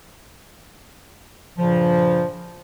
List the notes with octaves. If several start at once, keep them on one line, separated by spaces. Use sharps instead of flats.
G2 A#2 C#3 F3